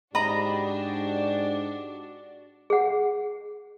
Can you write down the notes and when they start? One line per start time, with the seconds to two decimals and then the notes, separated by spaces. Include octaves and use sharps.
0.15 G#2 D4 F#4 G4 D#5 A#5 B5
2.70 G#4 F#5